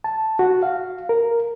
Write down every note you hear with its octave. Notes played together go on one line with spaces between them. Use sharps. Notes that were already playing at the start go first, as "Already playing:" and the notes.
A5
F#4
F5
A#4